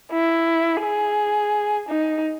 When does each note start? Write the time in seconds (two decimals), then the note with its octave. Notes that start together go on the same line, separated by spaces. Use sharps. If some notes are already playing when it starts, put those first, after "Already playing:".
0.11 E4
0.82 G#4
1.89 D#4